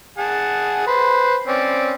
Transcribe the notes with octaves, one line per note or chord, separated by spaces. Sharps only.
G#4 F#5 A5
B4 C5
C4 C#4 D5